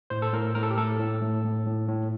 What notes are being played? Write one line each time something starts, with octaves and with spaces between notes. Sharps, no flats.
A2 C5
A4
A2 A#4
A2 A#4
A4
G4
A2 A4
A2
A2
A2
A2
A2